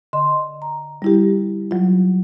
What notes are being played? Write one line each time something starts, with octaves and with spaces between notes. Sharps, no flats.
D3 D#5 C6
A#5
G3 E4 G4
F#3 F4